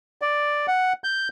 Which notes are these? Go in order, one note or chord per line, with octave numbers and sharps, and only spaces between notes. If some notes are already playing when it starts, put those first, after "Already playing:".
D5
F#5
G6